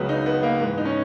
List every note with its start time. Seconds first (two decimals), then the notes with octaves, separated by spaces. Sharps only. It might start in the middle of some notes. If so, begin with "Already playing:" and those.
Already playing: C#2 C#3 F#3 B3
0.09 D#4
0.26 B3
0.43 A#3
0.60 G#2 E3 B3
0.78 D#4
0.85 C#4